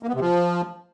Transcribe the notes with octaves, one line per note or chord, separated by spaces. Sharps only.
A#3
B3
C3
F3